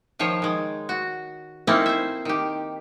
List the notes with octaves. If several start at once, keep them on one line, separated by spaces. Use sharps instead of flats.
D#3 F3 C5 C#5
D#3 G#3
F#4
A#3 C4 C#4 D#4 E4 A4
C5 E5
D#3 G4